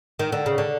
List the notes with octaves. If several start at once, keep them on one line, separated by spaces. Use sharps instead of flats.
D#3
D3
C#3
D3